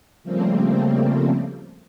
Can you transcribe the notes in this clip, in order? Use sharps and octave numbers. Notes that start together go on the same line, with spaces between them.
C#3 F3 G3 A3 A#3 C4